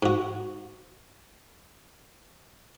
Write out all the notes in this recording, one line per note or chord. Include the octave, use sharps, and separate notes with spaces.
G#2 F#4